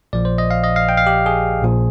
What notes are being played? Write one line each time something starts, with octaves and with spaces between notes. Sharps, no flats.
A#1 A#2 F3 D5
C5
D#5
F5
D#5
F5
G5
F5
G4
G#4
A#1 A#2 F3